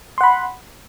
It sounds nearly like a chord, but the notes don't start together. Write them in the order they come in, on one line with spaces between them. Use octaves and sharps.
C6 F#5 B5